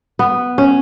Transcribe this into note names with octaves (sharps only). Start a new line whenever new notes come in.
B3
C#4